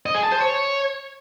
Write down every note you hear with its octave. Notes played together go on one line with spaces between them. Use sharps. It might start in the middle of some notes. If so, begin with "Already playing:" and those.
D#5
G#4
A5
C5
C#5